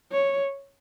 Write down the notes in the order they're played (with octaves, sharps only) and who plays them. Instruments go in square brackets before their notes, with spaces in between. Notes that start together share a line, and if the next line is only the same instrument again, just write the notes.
[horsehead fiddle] C#5